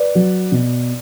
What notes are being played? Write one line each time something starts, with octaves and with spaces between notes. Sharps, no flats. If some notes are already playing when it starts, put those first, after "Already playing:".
Already playing: B4 D5
F#3
B2